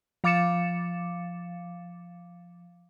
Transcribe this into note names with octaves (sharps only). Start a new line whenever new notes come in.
F3 F5 D6 A6 C#7 E7